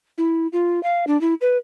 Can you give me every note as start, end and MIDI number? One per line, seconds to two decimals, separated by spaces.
0.18 0.47 64
0.53 0.82 65
0.83 1.05 77
1.07 1.19 62
1.21 1.34 64
1.41 1.57 71